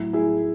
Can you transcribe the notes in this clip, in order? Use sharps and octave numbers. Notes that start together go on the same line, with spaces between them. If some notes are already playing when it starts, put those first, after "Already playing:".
Already playing: A2 F#3 E4
E4 G#4